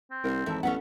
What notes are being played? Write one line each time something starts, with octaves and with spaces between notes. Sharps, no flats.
C4
C2 A#4 C5
G#1 E3 D#4 A4 E5 A5
A1 B3 C#4 A4 E5 F#5